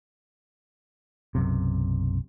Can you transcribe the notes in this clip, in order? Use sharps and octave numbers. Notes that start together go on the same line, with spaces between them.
B1 F#2 C3